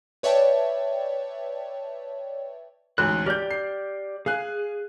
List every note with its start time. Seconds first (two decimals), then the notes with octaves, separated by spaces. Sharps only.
0.23 B4 C#5 D5 E5 G5 A5
2.98 A1 D2 G#2 F#6
3.26 G4 D5 F6 G6
3.51 C7
4.26 G#4 F5 G#5 F#6